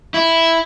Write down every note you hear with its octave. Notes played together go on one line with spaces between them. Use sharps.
E4